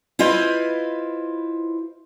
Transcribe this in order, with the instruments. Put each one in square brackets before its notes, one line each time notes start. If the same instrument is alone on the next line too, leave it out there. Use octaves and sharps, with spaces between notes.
[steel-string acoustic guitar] E4 F4 B4 C5 D#5